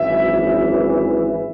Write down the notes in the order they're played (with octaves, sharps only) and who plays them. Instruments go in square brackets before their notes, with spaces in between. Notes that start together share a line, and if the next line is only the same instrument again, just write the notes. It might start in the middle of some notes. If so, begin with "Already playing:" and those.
Already playing: [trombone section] G#1 F#2 E3 [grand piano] E5